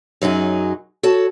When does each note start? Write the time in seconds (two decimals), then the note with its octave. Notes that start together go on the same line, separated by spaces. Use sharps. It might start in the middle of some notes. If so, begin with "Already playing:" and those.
0.22 F#2 F#3 D#4 G#4
1.03 F#4 A4 C#5 A5